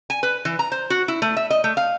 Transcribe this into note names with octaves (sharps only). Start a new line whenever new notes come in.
G#5
B4
E3
A#5
C5
F#4
E4
A3
E5
D#5
A3
F5